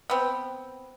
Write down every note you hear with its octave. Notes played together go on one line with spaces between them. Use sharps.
B3 C4